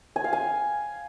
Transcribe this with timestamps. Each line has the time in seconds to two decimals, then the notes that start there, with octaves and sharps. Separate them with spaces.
0.16 G#5
0.24 F5
0.33 G#5